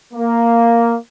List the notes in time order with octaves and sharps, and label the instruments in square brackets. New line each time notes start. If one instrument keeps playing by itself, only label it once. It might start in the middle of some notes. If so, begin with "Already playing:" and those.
[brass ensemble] A#3